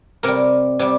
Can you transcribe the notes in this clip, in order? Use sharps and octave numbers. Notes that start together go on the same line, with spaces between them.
C3 G3 A#4
C3 G3